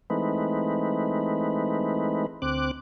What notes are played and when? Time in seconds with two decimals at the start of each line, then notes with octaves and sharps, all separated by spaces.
0.10 E3 G#3 A3 C4 D#4 B4
2.42 D2 C4 D6 F#6